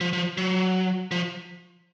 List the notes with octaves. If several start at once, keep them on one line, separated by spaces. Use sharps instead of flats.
F3
F3
F#3
F3